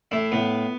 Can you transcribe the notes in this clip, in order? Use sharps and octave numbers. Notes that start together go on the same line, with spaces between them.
A2 E4
A2 B3